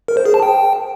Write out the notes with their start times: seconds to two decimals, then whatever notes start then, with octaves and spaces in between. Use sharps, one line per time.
0.08 A#4
0.17 C5
0.25 G#4
0.34 A5
0.43 G5